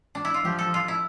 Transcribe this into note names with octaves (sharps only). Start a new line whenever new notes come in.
D4
E4
F4
F3 G4
A4
F4
E4